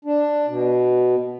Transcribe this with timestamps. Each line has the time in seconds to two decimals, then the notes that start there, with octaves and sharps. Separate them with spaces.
0.05 D4
0.47 B2